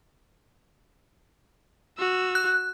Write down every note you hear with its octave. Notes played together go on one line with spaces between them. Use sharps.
F#4 E6
F#6